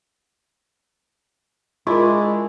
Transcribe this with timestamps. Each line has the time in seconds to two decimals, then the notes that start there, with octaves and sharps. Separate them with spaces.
1.87 G#3 D4 E4 F4 A#4 C6